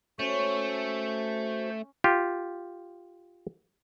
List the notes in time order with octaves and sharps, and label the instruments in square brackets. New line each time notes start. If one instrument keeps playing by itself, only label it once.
[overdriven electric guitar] A3 [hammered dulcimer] C#4 [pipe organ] F#4 C5
[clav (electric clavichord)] F4 G4